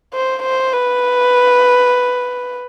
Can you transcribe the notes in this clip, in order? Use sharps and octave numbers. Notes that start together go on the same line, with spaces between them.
C5
C5
B4